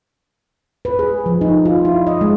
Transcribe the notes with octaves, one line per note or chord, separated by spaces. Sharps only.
B4
G#4
F3
D#4
F4
E4
D#5
G#3